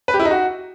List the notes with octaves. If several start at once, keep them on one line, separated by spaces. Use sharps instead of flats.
B4
G4
E4
D#4
F#4